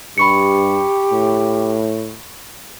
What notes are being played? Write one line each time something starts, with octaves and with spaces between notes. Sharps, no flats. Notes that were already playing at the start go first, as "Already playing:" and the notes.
G2 G4 B5 C#6 C#7
A2